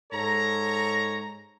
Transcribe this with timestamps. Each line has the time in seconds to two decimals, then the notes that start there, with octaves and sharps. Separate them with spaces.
0.12 G#2 A4 C#5 A#5